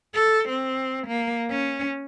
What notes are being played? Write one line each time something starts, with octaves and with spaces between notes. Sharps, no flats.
A4
C4
A#3
C#4